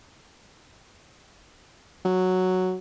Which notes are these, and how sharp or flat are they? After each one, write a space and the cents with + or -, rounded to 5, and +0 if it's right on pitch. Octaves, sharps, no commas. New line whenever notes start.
F#3 +0